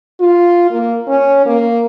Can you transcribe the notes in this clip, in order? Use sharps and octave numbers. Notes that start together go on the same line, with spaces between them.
F4
A#3
C#4
A#3